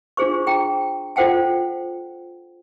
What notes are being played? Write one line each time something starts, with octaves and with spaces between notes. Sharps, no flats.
D4 F4 G#4 C5 C#6
G#4 G5 A#5
F4 A4 C5 F#5 G5 A5